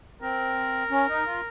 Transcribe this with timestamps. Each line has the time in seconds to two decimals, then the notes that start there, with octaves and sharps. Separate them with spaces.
0.22 C4 A#4
0.91 C#4
1.09 D#4
1.25 F4